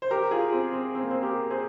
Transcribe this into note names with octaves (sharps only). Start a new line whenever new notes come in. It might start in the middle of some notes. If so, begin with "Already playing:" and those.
C5
G4 A#4
F4 G#4
C4
C4
C4
A#3
C4
G4 A#4
G#4 C5